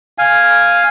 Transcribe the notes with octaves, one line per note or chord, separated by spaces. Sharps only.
F5 G#5